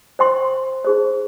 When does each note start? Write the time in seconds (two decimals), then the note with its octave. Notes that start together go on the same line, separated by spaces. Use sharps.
0.19 C5 G5 C6
0.85 D#4 G#4 C5